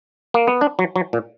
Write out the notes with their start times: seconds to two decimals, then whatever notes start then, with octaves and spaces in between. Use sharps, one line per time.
0.34 A#3
0.47 B3
0.61 D4
0.79 F#3
0.96 F#3
1.13 A#2